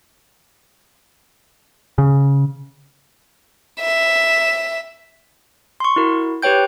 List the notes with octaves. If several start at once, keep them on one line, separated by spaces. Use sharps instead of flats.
C#3
E5
C6 C#6
E4 F#4 A#4
G4 B4 C#5 G5 G6